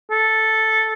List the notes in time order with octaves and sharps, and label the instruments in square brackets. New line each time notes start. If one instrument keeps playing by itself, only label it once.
[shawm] A4